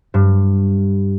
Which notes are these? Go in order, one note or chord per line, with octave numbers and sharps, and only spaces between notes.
G2